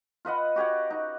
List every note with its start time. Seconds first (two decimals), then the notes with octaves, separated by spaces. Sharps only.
0.25 F4 B4 D#5 F#5
0.56 F#4 G4 C#5 F#5
0.90 D#4